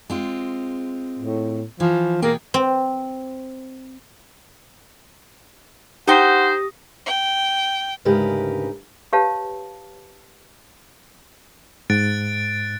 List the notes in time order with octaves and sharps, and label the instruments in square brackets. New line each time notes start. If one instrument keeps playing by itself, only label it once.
[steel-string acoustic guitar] G#3 C4 F4
[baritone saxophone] A2
[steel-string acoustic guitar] E3 [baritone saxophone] F3
[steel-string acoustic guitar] B2 G#4 G5 [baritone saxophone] A#3
[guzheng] C4
[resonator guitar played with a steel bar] D#4 G5 [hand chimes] G4 D#6 A#6 [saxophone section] C5 [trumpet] F#5
[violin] G5
[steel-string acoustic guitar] D2 G#2 C#3 G4 A#4 B4
[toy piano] G4 B4 C#5 F5 A5
[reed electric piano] G#2 [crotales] F#6 A6 D7